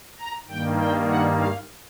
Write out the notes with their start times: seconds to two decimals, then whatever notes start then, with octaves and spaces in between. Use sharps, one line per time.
0.19 A#5
0.48 G2 D#3 G3 A#3 G5
0.78 G5
1.08 F#5
1.38 F5